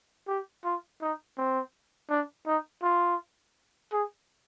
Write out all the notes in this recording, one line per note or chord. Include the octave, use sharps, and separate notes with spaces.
G4
F4
D#4
C4
D4
D#4
F4
G#4